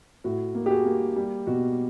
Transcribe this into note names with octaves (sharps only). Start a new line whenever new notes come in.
A2 F#4
A#3
G4
F#4 G#4
A#3
G3
B2 F#4